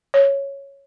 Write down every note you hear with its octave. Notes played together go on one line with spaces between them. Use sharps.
C#5